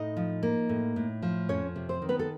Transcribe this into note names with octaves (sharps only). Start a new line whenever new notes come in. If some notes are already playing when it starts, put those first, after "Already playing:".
Already playing: A2 D#4 D#5
F3
A#3
A2
A2
F3
F2 C#4 C#5
C3
C4 C5
D#3
B3 B4
A4